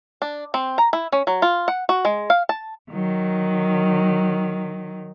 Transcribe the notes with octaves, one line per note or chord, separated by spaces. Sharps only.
D4
C4
A#5
E4
C#4
F#3
F4
F#5
F#4
G#3
F5
A5
D#3 F#3